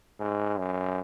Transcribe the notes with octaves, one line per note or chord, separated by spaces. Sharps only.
G#2
F#2